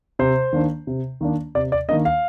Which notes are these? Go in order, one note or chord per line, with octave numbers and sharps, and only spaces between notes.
C3 C5
D#3 A#3 D4
C3
D#3 A#3 D4
C3 D5
D5
D#3 A#3 D4 D#5
F5